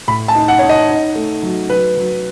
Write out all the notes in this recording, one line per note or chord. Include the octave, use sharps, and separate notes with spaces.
A2 B5
A5
D#4
F#5
D#4 C#5
D#5
D#4
A3
F#3
F#3 B4
F#3